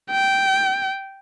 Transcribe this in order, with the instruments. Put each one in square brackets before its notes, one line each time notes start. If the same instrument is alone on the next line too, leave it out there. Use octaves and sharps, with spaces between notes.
[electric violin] G5